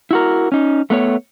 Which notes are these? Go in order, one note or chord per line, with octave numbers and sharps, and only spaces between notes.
E4 F#4 A#4
C#4 D#4
A3 B3 A#4 C#5